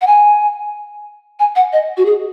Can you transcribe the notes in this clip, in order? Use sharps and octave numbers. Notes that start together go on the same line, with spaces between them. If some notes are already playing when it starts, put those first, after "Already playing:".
F#5
G#5
G#5
F#5
D#5
F#4
G#4